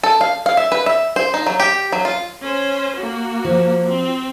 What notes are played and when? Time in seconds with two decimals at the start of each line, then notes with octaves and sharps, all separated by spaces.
0.03 A4
0.21 F5
0.46 F5
0.57 E5
0.72 B4
0.86 E5
1.16 C5
1.34 D#4
1.46 F#3
1.60 G4
1.92 F#3
2.05 F4
2.41 C#4 C5
2.96 A#3 F#4
3.45 F3
3.88 C4